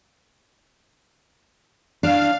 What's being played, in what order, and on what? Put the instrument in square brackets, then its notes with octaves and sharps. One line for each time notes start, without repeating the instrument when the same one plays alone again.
[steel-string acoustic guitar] D4 [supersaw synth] F5